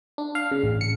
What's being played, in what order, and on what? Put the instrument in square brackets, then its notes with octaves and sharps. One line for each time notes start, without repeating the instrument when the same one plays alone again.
[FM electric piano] D4
F5
C#3
A1
C#7